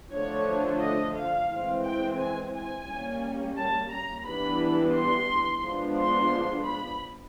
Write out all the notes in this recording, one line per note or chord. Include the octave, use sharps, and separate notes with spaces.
D3 F3 A3 D4 C#5
D#5
F5
E3 G#3 C4
G5
G#5
G#5
G3 A#3 C#4
A5
A#5
E3 G3 B3 D4 B5
C6
F3 G#3 B3 D4
C6
B5